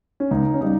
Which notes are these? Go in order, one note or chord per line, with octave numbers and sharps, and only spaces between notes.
C#4
C#2 D#4
C#4
C#3 G3 D#4